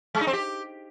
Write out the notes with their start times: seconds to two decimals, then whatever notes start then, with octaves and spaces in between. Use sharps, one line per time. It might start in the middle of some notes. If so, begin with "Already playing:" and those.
0.15 G#3
0.21 D#4
0.27 C4
0.33 G4